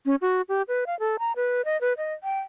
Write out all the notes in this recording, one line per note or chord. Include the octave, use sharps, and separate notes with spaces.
C#4
F#4
G4
B4
F5
A4
A#5
B4
D#5
B4
D#5
G5